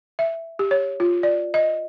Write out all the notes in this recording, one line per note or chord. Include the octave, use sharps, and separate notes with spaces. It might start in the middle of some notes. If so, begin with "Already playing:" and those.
E5
G4
C#5
F4
D5
D#5